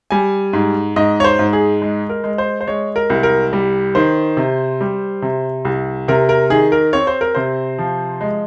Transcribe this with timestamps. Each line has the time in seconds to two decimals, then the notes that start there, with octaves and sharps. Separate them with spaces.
0.11 G3 G#5
0.53 G#2
0.96 G#2 D#5
1.20 C#5
1.24 C5
1.39 G#2
1.53 G#4
1.82 G#3
2.09 A#4
2.24 G#3
2.38 C5
2.61 C5
2.67 G#3 C#5
2.96 A#4
3.10 C2
3.23 A#4
3.53 G3
3.95 D#3 C5
4.37 C3
4.81 G3
5.22 C3
5.65 C2
6.08 C3 A#4
6.29 A#4
6.50 D#3 G#4
6.72 A#4
6.93 C4 C#5
7.07 C5
7.21 A#4
7.35 C3 C5
7.79 F3
8.21 G#3